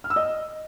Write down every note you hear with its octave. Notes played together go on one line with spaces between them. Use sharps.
F6
E6
D#5